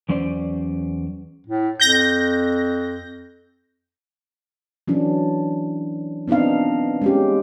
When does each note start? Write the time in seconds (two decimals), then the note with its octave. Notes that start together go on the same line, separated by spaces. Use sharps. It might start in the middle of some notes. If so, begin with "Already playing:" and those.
0.09 E2 F#3 C#4 C5 D5
1.47 A2
1.80 F2 G6 A#6
4.88 E3 F#3 C#4 D4
6.28 B3 C4 D4 D#4 F5
7.02 G#3 C#4 G4